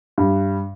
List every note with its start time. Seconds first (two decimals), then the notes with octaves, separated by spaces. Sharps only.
0.18 G2